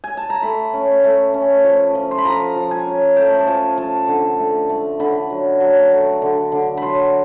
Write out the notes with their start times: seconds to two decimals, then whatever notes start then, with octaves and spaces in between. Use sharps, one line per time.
0.04 G#5
0.17 A5
0.30 A#5
0.42 A3 B5
0.74 C#4
1.04 A3
1.34 C#4
1.64 F3
1.95 F3
2.11 C6
2.18 B5
2.25 F3 A#5
2.56 F3
2.71 G#5
2.87 C#4
3.16 A3 G5
3.39 A5
3.47 F3 G#5
3.78 F3 A5
4.08 D3
4.39 A3
4.69 A3
5.00 D3 B5
5.30 F#3
5.60 F#3
5.91 A3
6.22 D3
6.52 D3
6.77 F#3 B5 C6